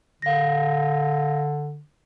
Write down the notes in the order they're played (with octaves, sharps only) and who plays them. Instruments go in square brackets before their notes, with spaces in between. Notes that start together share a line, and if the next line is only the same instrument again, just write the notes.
[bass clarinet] D3 [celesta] F5 A#6